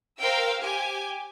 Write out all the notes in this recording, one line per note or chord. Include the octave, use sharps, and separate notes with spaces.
A#4 C5 F5 G5 E6
G4 G#5